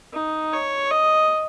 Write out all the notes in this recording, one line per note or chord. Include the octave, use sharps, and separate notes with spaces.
D#4
C#5
D#5